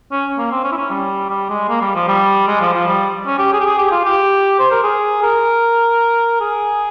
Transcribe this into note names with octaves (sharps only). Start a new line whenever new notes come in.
C#4
A#3
C4
C#4
E4
C#4
G3
G3
G#3
A#3
G3
F3
G3
G#3
F3
F3
G3
C#4
G4
G#4
G4
G#4
G4
F4
G4
C5
A#4
G#4
A#4
G#4